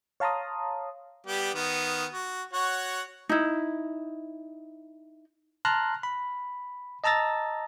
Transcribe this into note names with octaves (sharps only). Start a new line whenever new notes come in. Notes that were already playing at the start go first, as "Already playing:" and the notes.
C#5 F5 A5 A#5 C6 D#6
G3 B3 G4
D#3 B3
F#4
F#4 C#5 F#5
D#4 E4
A5 A#5 C6 F6 F#6 A#6
B5
D#5 A5 A#5 E6 A6 A#6